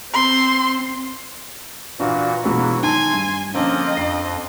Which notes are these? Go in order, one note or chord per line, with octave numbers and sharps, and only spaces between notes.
C4 C6
A#2 E3 D4 F4 F#4
B2 E3 F#3 G#3 E4 F4
D#3 G#5 A5 C6
G2
D3 F3 A#3 C4 C#4 D#5
F2 C7